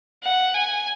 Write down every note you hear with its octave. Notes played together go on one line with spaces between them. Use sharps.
F#5
G#5